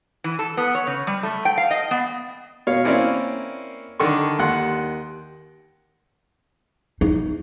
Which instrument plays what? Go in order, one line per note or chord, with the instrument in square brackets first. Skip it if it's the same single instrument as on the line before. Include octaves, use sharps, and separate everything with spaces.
[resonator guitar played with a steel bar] E3
A4
B3
C#5
C#3
G3
A3
G5
F5
D#5
B3
[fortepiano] B2 C#5 F5
A#3 C4 C#4 E4 D5 F5
D3 D#3 D4 A4 C#6
D#2 D#3 F#5 C6
[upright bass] D#4